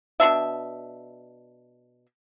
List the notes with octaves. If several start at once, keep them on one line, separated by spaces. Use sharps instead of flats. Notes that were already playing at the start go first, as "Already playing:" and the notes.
B2 C#4 D4 E5